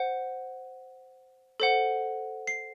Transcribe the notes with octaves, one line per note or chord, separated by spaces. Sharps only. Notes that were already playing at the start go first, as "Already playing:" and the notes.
Already playing: C5 F#5
A4 C5 F#5
C7